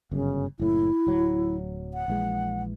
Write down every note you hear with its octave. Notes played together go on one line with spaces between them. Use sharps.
G1 F#2 C#3
F#1 A2 E4
D1 F#3
F#5
A#1 E3 G#3